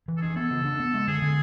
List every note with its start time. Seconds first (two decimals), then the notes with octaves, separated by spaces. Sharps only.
0.08 E3
0.17 A4
0.22 D4 G#4
0.36 B3 A4
0.51 C#3
0.65 D4
0.80 B3
0.94 G#3
1.08 D3 G#4
1.22 D3